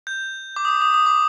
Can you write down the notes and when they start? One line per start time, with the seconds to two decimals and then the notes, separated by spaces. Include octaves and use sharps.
0.07 G6
0.56 D6
0.65 D#6
0.69 D6
0.82 D#6
0.94 D#6
1.06 D6